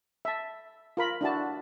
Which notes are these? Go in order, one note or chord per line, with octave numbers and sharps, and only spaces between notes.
E5 A5
F4 A#4 B5
D4 E4 F#4 A5